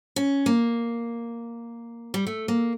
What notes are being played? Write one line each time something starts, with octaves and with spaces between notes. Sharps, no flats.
C#4
A#3
G3
A3
A#3